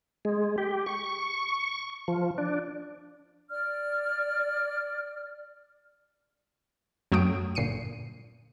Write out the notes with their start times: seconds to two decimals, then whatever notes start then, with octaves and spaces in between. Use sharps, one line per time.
0.25 G#3
0.58 G4
0.86 C#6
2.08 F3
2.38 D4
3.49 D5 F6
7.12 F#2 F#3 A3 G5 D#6 D7
7.55 G1 A#2 C7 C#7 D#7